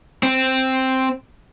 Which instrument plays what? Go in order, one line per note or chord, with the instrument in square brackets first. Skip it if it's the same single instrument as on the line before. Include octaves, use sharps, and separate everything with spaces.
[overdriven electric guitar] C4